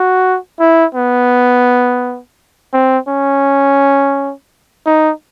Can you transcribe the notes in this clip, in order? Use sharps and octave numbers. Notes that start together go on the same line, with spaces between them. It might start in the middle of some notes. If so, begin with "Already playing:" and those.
Already playing: F#4
E4
B3
C4
C#4
D#4